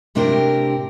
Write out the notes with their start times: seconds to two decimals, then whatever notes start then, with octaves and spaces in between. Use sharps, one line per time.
0.15 A2 C3 C4 D4 G4 A#4